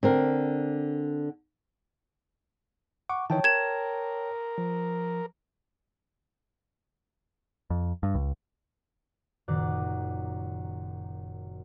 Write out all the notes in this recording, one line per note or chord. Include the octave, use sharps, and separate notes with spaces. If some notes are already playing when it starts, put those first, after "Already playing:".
D3 C4 A#4
F#5 C#6 D6
D#3 E3 C#5 G5 A5
A#4 G#6 E7
F3
F2
G2
C#2
F#1 F#2 A#2 D#3 D5 F#6